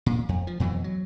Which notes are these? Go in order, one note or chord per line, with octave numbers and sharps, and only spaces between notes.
A#2
F2
F3
F2 B2 E3 F#3
F#3